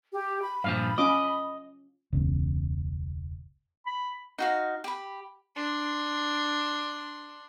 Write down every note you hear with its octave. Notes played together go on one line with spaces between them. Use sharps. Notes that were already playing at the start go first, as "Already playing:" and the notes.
G4
B5
G2 A#2 F3 F5
C#4 F4 D#5 D6
E1 C#2
B5
D#4 F#4 F5
G4 B5
D4 C6